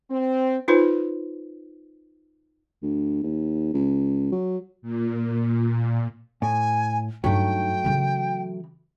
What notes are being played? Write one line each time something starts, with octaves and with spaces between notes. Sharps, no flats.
C4
D#4 F4 B4 C5
D2
D#2
C#2
F#3
A#2
A2 G#5
G2 F#3 A3 D#4 G5
C#3 E3